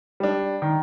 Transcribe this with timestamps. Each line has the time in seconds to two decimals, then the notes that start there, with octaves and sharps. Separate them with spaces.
0.20 G3 D4
0.62 D#3